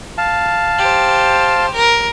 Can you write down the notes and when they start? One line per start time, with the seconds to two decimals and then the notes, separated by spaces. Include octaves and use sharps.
0.18 F5 A5
0.79 G4 C5
1.75 A#4